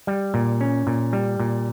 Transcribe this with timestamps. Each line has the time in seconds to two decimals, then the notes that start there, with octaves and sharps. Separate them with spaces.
0.07 G3
0.34 A#2
0.61 C#4
0.87 A#2
1.13 G3
1.40 A#2